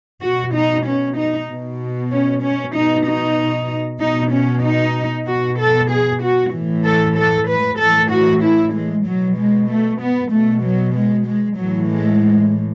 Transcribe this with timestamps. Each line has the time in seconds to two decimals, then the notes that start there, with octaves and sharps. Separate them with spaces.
0.22 B2 F#4
0.54 D#4
0.86 C#4
1.17 D#4
1.49 B2
2.11 C#4
2.43 C#4
2.74 B2 D#4
3.06 D#4
4.00 B2 D#4
4.32 C#4
4.63 D#4
5.27 B2 F#4
5.59 A4
5.90 G#4
6.22 F#4
6.53 A2 E3
6.85 A4
7.17 A4
7.48 B4
7.79 A2 E3 A4
8.11 F#4
8.43 E4
8.74 G#3
9.05 B2 F#3
9.37 G#3
9.69 A3
10.01 B3
10.31 B2 A3
10.63 F#3
10.94 G#3
11.26 G#3
11.57 A2 E3 F#3
11.89 G#3